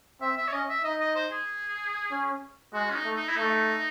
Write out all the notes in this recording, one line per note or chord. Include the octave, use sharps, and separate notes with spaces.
C4 E5
E5
C#5
C#4 D#5
E5
D#4 D#5
D#5
C5
G#4
C#4
G#3 F#4
C#4
D#4
A3
D#4
E4
A3 D#4